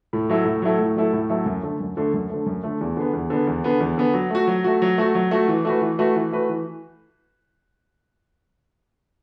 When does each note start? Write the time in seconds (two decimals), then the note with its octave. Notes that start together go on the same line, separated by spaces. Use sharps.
0.13 A2
0.29 F#3 A3 E4 A4
0.45 A2
0.62 F#3 A3 E4 A4
0.79 A2
0.96 F#3 A3 E4 A4
1.13 A2
1.29 F#3 A3 E4 A4
1.46 F#2
1.63 D3 A3
1.80 F#2
1.97 D3 A3
2.14 F#2
2.30 D3 A3
2.46 F#2
2.63 D3 A3
2.81 E2
2.97 D3 B3
3.13 E2
3.30 D3 B3
3.47 E2
3.64 D3 B3
3.80 E2
3.98 D3 B3
4.14 F#3
4.30 A3 F#4
4.47 F#3
4.64 A3 F#4
4.82 F#3
4.98 A3 F#4
5.15 F#3
5.31 A3 F#4
5.48 E3
5.65 A3 F#4 B4
5.81 E3
5.98 A3 F#4 B4
6.16 E3
6.32 A3 F#4 B4
6.49 E3